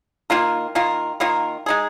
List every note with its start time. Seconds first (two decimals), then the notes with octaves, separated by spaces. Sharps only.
0.30 D#3 A#3 F4 A#4
0.75 D#3 A#3 F4 A#4
1.20 D#3 A#3 F4 A#4
1.66 G#3 D#4 G#4